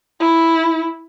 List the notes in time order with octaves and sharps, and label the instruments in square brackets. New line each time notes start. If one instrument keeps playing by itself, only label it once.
[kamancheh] E4